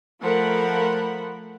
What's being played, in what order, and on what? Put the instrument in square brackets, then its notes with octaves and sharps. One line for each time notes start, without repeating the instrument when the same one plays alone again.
[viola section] F3 A3 A#4 F#5 B5